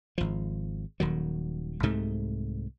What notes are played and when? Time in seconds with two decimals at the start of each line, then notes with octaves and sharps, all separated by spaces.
0.18 G#1 F3
1.00 D#1 D#3 F#3
1.83 C2 G#2 C3 A3